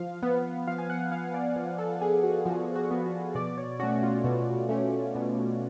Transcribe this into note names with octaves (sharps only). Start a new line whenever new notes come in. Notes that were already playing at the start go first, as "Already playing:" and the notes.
Already playing: F3 F5
B3
F3 F5
G#5
F#5
B3 F5
D5
F3
A4
B3 G#4
F#4
F3 F#4
F#4
B3
F#4
B2 D5
C#5
A3 C#4 F#4
F4
B2 F#4
A3 C#4
B2